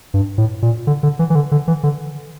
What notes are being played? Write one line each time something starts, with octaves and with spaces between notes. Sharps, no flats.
G2
A2
A#2
D3
D3
E3
E3
D3
D3
E3
D3